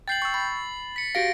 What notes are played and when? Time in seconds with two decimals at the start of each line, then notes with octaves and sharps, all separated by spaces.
0.08 G5 G6 A6 C7 F#7
0.22 C#6 E6
0.34 B5 A6
0.96 B6 C#7
1.15 F#4 G4 F5 A#6 D7